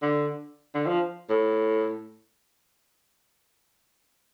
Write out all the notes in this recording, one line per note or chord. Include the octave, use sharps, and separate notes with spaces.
D3
D3
F3
A2